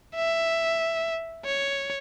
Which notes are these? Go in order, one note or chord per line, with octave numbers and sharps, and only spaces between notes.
E5
C#5